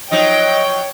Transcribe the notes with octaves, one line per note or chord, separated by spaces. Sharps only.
F3 F#3 D#4 C#5 D#5 G5